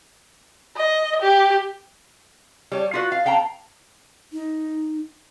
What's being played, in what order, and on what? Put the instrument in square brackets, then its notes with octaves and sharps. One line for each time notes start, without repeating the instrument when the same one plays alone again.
[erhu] D#5
G4
[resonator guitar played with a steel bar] G3 C#5
F4 F#4 B4
F5
B3 F5 G5 A5 A#5
[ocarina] D#4